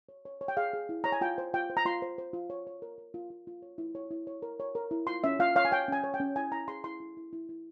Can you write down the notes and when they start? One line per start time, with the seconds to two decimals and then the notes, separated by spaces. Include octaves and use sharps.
0.09 C#5
0.25 C#5
0.41 C#5
0.48 G5
0.57 G#4 F5
0.73 G#4
0.89 E4
1.04 C#5 A#5
1.12 G#5
1.21 F4 G5
1.38 C5
1.54 F4 G5
1.70 C5
1.77 A#5
1.85 F4 C6
2.02 C5
2.18 C5
2.33 F4
2.50 C#5
2.67 C#5
2.82 A#4
2.98 A#4
3.14 F4
3.30 F4
3.47 F4
3.62 C#5
3.78 E4
3.95 C#5
4.11 E4
4.27 C#5
4.42 A#4
4.60 C#5
4.75 A#4
4.91 E4
5.07 F4 C6
5.24 C#4 E5
5.40 F4 F5
5.55 C#5 F5
5.65 G#5
5.71 C#5 G5
5.88 C#4 G#5
6.04 C#5
6.14 G5
6.20 C#4
6.36 E4 G#5
6.52 E4 A#5
6.68 G#4 C6
6.84 E4 C6
7.00 E4
7.17 E4
7.33 E4
7.49 E4